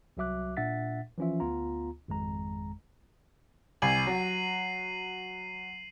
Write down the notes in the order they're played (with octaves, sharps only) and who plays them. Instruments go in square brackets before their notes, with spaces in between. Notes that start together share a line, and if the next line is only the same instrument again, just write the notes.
[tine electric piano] C2 F#3 F#4 E5 D6 F#6
A#2 D4 E5 F#5 A6 B6
E3 F3 C#4 F4 E5
D2 B3 F4 A#5
G#1 F2 G#3 A#5
[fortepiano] C2 G#5 [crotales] C7 D#7 F#7
[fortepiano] F#3